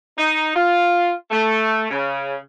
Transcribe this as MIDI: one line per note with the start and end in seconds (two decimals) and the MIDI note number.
0.18 0.53 63
0.56 1.12 65
1.31 1.87 57
1.91 2.36 49